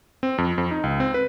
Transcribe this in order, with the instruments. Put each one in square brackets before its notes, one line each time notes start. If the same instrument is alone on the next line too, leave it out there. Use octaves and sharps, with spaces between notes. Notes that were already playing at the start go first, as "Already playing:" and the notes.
[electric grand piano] C4
F2
F2
D#4
C#2
C4
B4